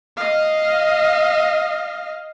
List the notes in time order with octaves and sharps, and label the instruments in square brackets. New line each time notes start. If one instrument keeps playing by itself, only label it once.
[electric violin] D#5 F5